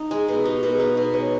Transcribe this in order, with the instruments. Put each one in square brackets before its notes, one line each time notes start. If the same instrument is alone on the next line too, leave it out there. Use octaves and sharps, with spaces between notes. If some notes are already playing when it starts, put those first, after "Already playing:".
Already playing: [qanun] D#4
[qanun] G#3 [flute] G#4
[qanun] B2 [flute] G#4
[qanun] D#4 [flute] G4
[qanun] B2 [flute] A#4
[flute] G#4
[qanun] D#4
[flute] B4
[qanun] B2
[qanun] G#3 [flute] C#5